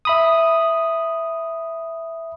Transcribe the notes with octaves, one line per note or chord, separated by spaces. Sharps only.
E5 B5 D#6